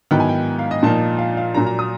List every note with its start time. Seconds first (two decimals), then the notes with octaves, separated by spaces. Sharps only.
0.11 G#2 D#3 F#3 B3 E4 G5
0.20 G#5
0.29 G5
0.59 F5
0.71 D#5
0.83 A#2 F3 A#3 D#4 A5
1.19 F5
1.37 F5
1.54 A#2 F#3 A#3 A#5
1.66 A#5
1.79 D#6